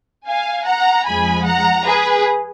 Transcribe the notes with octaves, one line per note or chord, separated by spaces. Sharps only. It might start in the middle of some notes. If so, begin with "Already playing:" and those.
F5 G#5
F#5 A#5
F2 F3 G#3 G#5 B5
F#5 A#5
G#4 B4